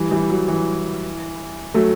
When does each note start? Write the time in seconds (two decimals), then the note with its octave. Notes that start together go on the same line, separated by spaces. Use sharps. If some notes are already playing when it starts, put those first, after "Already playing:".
Already playing: E3 G3
0.11 E3 G3
0.30 F#3
0.48 E3
1.74 F#3 A3